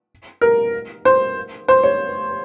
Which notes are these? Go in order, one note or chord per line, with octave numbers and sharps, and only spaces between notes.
A#4
C5
C5
C#5